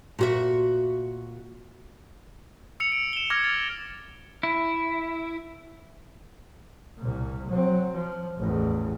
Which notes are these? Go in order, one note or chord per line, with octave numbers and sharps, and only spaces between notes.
A#2 F#4 E5
E6 C#7 F7
D7
E7 G7
D6 E6 F6 G#6 A#6 F7
A6
E4
C2 A#2
F#3 C4
F3
A1 E2